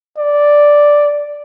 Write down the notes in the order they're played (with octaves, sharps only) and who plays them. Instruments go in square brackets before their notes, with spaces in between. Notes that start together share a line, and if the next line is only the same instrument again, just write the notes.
[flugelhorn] D5